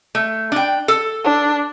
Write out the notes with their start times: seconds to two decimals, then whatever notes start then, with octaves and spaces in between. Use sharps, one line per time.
0.15 A3
0.52 D4 G5
0.88 A4
1.25 D4